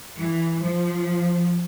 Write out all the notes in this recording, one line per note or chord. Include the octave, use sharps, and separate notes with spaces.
E3
F3